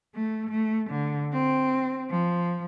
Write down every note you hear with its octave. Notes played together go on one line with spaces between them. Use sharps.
A3
A3
D3
C4
F3